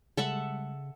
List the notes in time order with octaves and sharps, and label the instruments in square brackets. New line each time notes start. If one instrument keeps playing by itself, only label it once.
[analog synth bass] C#3 [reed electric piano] G3 G#3 [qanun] A4 E5 F#5